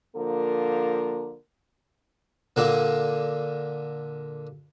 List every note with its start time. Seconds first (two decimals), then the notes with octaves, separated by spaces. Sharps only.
0.16 D3 F3 A#3 A4 A#4
2.56 A#2 D3 A#3